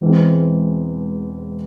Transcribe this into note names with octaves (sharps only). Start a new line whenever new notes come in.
E1 E2 E3 G#3 C4